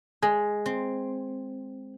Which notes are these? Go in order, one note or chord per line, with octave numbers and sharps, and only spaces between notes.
G#3 G#4
C4